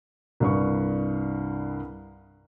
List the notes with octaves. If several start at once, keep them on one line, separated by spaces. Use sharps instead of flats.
C2 G2 C#6